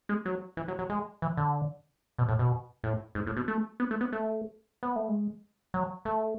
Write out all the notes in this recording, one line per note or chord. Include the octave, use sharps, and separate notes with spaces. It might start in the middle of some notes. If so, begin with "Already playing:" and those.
G#3
F#3
E3
F#3
F#3
G#3
E3
D3
B2
A2
B2
A2
G#2
A2
B2
A3
B3
A3
B3
A3
B3
A3
G#3
F#3
A3